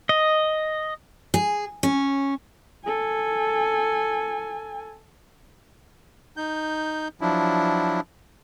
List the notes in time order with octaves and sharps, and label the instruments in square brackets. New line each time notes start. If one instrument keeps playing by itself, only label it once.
[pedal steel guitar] D#5
[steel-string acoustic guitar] G#4
C#4
[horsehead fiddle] A4 G#5
[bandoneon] D#4 G6
F3 F#3 D4 E4